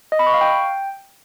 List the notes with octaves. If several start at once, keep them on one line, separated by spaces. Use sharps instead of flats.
D#5
B5
C#6
F5
G5